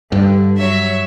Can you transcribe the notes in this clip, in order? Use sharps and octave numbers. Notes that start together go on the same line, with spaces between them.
G2 D3
F#3 C#5 E5